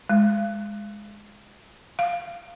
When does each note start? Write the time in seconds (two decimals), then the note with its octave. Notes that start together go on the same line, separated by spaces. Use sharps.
0.09 G#3
1.99 F5